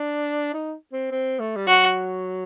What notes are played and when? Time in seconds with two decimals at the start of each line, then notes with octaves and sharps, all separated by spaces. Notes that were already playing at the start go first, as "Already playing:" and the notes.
Already playing: D4
0.54 D#4
0.92 C4
1.11 C4
1.40 A3
1.56 G3
1.68 F#3 F#4